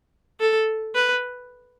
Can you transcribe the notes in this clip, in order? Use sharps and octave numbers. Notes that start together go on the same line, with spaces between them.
A4
B4